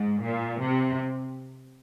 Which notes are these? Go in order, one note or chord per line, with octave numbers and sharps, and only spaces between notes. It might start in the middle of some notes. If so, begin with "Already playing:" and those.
Already playing: G#2
A#2
C3